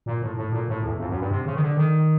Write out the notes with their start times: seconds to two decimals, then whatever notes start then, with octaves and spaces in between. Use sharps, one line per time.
0.06 A#2
0.22 A2
0.37 A2
0.52 A#2
0.69 A2
0.84 E2
0.99 F2
1.09 F#2
1.20 G2
1.31 C3
1.46 C#3
1.55 D#3
1.62 D3
1.77 D#3